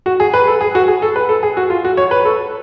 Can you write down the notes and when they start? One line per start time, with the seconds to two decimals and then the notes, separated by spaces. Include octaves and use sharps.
0.06 F#4
0.20 G#4
0.34 B4
0.47 A4
0.61 G#4
0.75 F#4
0.88 G#4
1.02 A4
1.16 B4
1.29 A4
1.43 G#4
1.57 F#4
1.70 F4
1.85 F#4
1.97 C#5
2.11 B4
2.25 A4